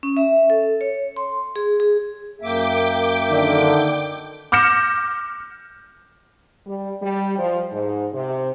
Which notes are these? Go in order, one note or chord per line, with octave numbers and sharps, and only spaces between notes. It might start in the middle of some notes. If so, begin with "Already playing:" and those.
C#4
E5
A4
C#5
C6
G#4
G#4
F#2 A#3 E5 G5 D6
D3 D#3
D6 F6 G6 A#6 C#7 E7
G3
G3
F3
G#2
C3